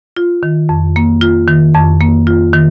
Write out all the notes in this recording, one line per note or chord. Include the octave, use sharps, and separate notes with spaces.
F4
D#3
F2
A#3
F4
D#3
F2
A#3
F4
D#3